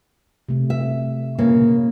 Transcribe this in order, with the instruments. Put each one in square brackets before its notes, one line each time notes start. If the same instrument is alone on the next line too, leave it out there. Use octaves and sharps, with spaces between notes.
[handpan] C3 A3
[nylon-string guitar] E5
[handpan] A#2 [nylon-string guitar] C#3 A#3